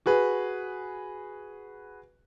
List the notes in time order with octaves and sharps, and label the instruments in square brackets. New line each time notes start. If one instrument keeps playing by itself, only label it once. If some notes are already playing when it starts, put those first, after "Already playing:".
[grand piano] F#4 G#4 B4